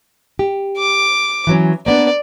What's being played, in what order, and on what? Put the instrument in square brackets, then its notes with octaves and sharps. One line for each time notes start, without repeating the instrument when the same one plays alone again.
[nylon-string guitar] G4
[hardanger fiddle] D6
[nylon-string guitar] E3 F#3 C#4
[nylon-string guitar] A#3 B3 D4 [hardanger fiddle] D5